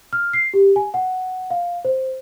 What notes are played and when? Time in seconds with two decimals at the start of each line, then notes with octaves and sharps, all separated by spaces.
0.13 F6
0.33 C7
0.54 G4
0.76 G#5
0.94 F#5
1.50 F5
1.85 C5